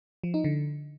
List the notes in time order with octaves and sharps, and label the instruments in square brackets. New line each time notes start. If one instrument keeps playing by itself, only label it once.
[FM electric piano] F3
D#4
D3